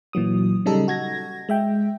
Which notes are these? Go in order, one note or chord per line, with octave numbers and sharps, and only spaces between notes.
A#2 E3 F#3 D#6
C#3 G3 D#4 A4
F#4 G#6 A#6
G#3 E5 G5